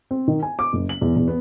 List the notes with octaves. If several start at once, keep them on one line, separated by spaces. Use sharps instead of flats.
C4
D#3
G#5
D6
F#1
F#7
E2
E2
B3